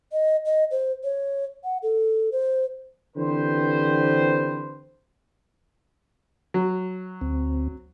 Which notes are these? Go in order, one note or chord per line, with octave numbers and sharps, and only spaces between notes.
D#5
D#5
C5
C#5
F#5
A4
C5
D3 E3 C4 G4 B4 C5
F#3
D2 C4